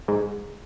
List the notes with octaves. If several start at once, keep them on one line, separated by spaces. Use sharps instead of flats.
G#2